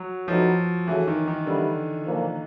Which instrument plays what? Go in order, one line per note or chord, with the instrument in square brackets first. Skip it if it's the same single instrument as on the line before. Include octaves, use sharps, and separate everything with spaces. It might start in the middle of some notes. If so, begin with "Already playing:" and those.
Already playing: [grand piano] F#3
[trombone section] A2 F#3 B3 D#4 [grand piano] F3
[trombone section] C#3 F#3 A3 [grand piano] E3
[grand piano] D#3
D#3
[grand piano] D3 [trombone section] D#3 G3 B3 E4
[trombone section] A#2 F3 A#3